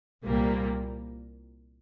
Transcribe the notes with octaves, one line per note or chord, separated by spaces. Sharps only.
C2 A#2 G3 A#3